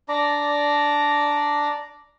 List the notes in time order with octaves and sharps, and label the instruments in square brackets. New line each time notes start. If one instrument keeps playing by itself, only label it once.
[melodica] D4 D5 A#5